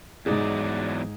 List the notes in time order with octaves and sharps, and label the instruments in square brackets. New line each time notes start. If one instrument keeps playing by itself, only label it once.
[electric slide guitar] E2 F#3 D5 [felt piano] G#2 D#4 G#4